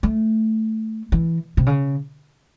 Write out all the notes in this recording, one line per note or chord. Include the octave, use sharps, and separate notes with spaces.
A3
E3
C3
C#3